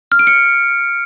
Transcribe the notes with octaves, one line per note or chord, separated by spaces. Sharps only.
F6
D7
C#7